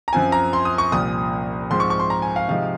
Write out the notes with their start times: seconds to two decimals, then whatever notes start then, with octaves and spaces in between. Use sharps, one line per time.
0.08 A#5
0.13 F#2 F3 C4 F4 G#5
0.32 A#5
0.53 C6
0.65 D#6
0.78 C#6
0.92 C2 A#2 F3 D#6
1.70 G#2 F3 C4 C6
1.80 C#6
1.90 C#6
2.00 C6
2.10 A#5
2.22 G#5
2.36 F5
2.48 C3 F3 G#3 D#4 F5